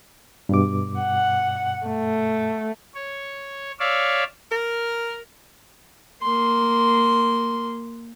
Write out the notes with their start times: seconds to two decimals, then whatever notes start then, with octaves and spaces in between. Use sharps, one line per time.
0.49 G2 B2 D6
0.99 F#5
1.87 A3
2.95 C#5
3.79 C#5 D5 E5 F5
4.51 A#4
6.23 A#3 C6